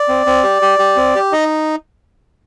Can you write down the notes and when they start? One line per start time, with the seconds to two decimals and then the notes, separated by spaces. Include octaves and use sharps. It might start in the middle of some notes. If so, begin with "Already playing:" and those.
Already playing: D5
0.09 C4
0.26 C4
0.43 G4
0.62 G4
0.79 G4
0.96 C4
1.15 G4
1.32 D#4 D#5